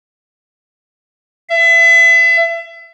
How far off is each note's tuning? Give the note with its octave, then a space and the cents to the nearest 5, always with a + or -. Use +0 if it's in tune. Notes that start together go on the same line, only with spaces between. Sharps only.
E5 +30